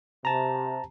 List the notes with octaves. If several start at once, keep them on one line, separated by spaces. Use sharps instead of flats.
C3 A5 A#5